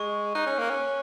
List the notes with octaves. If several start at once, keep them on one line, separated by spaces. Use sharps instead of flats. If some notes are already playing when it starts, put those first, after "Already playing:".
Already playing: G#3 C#6
D#4 F#6
C#4
A#3
C#4